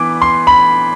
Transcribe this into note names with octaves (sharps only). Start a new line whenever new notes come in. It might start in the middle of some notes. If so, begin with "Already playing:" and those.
Already playing: E3 B3 D6
C6
B5